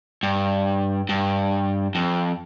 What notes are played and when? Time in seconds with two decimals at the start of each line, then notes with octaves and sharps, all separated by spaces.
0.23 G2
1.09 G2
1.95 F2